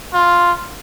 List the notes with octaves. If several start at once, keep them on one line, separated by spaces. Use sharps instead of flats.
F4